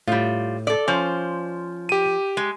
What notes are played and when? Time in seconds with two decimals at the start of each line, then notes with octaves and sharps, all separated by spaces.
0.08 A2 G3 F4
0.67 A4 D5
0.88 F3 C#4 C5
1.89 G4 D#7
2.37 G#3